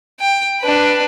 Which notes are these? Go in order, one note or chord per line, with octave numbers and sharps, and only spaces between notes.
G5
D4 B4